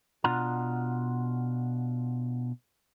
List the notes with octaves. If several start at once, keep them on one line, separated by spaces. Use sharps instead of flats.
B2 D4 F4 F#5 A#5 C6